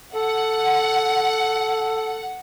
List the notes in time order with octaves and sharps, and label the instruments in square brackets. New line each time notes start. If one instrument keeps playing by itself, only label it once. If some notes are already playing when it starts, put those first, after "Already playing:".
[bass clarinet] A4 [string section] F#5